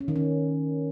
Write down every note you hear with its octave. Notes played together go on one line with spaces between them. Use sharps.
C#4
D#3
C#4